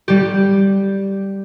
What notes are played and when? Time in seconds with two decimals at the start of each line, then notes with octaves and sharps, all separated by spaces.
0.08 G3 G4